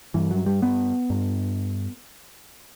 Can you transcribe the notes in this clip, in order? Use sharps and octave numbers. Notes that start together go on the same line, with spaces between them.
G2 E3
F#3
G3
B3
G2